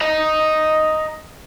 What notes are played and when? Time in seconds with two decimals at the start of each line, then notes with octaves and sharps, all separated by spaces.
0.01 D#5 A#5